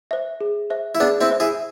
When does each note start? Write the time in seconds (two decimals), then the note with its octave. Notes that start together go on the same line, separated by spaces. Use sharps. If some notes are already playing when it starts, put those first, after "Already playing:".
0.11 C5 E5
0.41 G#4
0.70 C5 E5
0.95 E4
1.00 B3 D4 G#4
1.21 C4 E4
1.31 C5 E5
1.40 E4 G#4